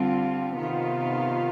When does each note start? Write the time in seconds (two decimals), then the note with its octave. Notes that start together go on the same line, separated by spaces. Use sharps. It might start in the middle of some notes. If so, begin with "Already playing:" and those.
Already playing: D3 G3 C4 F4
0.58 C3 D#3 B3 F4